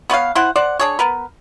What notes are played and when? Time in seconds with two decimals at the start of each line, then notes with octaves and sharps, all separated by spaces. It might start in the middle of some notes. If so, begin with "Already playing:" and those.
0.10 B3 B4 C#5 F5
0.35 E4 C5 F#5
0.56 C5 D5 F#5
0.79 D4 G#4 C#5
0.99 B3 A#4 B4